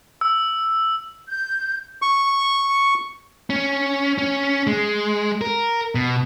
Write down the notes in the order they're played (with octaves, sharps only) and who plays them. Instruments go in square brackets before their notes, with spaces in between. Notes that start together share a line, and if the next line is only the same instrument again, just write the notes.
[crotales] E6
[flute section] G6
[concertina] C#6
[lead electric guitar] C#4
C#4
G#3
A#4
B2